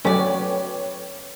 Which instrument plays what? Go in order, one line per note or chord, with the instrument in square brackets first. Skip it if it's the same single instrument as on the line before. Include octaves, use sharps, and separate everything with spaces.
[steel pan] F#3 A3 [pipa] C#4 D5 [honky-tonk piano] B4 C#5 G5